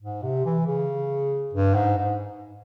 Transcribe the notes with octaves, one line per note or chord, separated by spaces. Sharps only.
G#2
C3
E3
C#3
G2
G#2
G#2